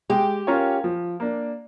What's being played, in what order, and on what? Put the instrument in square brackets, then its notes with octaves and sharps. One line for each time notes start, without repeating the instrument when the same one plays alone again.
[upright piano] G#3 [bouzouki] G4
[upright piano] C#4 F4 A#4 C#5
F3
A#3 D4